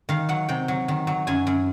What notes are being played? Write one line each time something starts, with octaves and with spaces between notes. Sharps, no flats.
D#3 F5
F#3 F#5
C3 G5
F#3
D#3
F#3
F#2 G#5
F#2